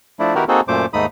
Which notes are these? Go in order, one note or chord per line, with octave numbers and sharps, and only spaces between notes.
F3 A3 D4 E4
D#3 B3 E4 F#4 G4 A#4
A#3 C4 D#4 F#4 G#4 A4
F#2 A#2 A3 C5 D6
D#2 G#2 A3 D#4 B5 D#6